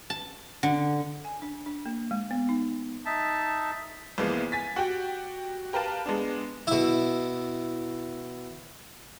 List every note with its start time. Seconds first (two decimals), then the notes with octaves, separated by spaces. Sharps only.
0.10 A5
0.63 D3
1.25 G#5
1.42 D4
1.66 D4
1.86 A#3
2.11 G#3
2.31 B3
2.49 D#4
3.06 D#4 E5 A5
4.18 C2 E3 F3 G#3 A#3 B3
4.52 G#5 A6 B6
4.76 F#4 G4 G5
5.73 G4 A#4 B4 F5 A5
6.06 G#3 B3 D4
6.67 B2 E4